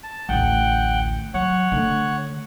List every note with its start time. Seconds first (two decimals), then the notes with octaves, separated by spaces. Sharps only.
0.03 A5
0.29 A1 D2 F#5 G5
1.34 F#3 C#5 F#5
1.72 D3 A3